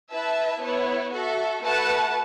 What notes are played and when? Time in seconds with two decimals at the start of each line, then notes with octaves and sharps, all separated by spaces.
0.11 E4 B4 E5 A5
0.62 B3 E4 C#5
1.12 F#4 A4 E5
1.63 A3 F#4 B4 F#5 A5